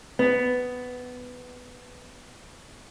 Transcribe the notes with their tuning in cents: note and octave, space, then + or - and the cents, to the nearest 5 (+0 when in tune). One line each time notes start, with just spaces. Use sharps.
B3 +10